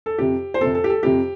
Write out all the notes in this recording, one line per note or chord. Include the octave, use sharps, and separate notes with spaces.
A4
F2 C3 G4
C5
F2 C3 A4
A4
G4
A4
F2 C3 G4